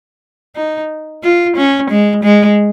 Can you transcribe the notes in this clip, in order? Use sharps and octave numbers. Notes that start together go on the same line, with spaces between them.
D#4
F4
C#4
G#3
G#3